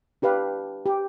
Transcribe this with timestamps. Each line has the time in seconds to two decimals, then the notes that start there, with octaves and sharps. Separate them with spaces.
0.22 D4 G4 B4 F5
0.86 G4